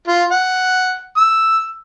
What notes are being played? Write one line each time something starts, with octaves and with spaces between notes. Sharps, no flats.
F4
F#5
E6